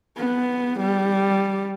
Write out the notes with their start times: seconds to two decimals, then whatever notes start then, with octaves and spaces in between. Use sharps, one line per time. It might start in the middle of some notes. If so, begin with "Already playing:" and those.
0.17 B3
0.80 G3